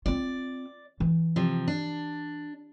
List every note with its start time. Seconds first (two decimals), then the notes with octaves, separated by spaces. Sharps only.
0.06 C4 F4 D5
1.00 E3
1.36 C3 F3
1.68 D4